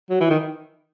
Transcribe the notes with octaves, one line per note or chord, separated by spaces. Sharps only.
F#3
E3
D#3